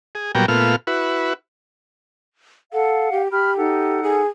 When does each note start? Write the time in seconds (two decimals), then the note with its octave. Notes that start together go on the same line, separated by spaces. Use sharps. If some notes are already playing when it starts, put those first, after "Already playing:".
0.15 G#4
0.35 A#2 F#3 G3 B3 G5 A#5
0.48 A#2 A3 B3 F4 F6
0.87 E4 F#4 B4
2.73 A4 F5 F#5
3.12 G4
3.31 G4 B5 F6
3.57 D#4 A4 F#5
4.03 G#4